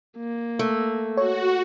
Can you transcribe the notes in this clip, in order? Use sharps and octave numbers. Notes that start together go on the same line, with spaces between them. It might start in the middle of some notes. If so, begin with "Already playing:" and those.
A#3
A3
F#4 C#5